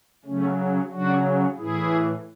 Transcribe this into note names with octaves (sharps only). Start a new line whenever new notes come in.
C#3 F#3 A3 C#4
C#3 F#3 D4 F#4
A2 E3 E4 G#4